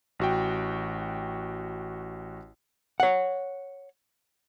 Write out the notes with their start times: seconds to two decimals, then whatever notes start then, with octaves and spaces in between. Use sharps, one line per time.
0.19 A1 F#4 G5
3.00 C#5 F#5